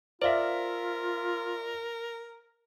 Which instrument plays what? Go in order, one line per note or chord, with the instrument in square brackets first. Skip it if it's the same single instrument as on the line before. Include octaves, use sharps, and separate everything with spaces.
[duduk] F4 [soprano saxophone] A#4 [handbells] C5 F5 [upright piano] D5 E5